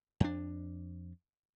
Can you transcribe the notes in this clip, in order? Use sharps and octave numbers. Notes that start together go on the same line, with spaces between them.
F2 D4